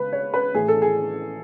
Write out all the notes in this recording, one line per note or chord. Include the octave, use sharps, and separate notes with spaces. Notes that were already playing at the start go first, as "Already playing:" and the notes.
Already playing: C#3 G#3 B4
C#5
B4
A2 E3 A3 G#4
A4
G#4